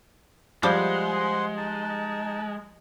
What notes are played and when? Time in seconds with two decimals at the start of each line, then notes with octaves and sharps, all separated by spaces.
0.63 F3 G3 G#3 C5 F#5 C6
1.57 D#4 A5